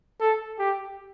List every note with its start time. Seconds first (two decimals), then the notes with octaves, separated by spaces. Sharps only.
0.21 A4
0.59 G4